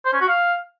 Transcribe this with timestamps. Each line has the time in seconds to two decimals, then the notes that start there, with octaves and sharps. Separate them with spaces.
0.05 C5
0.13 C#4
0.21 F#4
0.28 F5